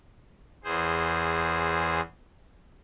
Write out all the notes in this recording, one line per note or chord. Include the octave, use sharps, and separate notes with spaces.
E2 G#4 C5